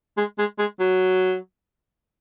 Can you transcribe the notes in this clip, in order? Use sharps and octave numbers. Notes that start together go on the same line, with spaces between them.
G#3
G#3
G#3
F#3